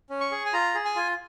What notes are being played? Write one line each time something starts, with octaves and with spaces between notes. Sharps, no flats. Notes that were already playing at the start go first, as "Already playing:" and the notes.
C#4
C#6
G#4
G#5
F4 A#5
G#4
G#5
F4